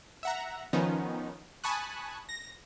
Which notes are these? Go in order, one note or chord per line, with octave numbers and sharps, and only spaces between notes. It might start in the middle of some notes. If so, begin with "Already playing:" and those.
E5 F#5 A#5
D#3 F3 B3 C#4 D#4
G#5 A5 B5 C#6 D#6 F#6
A#6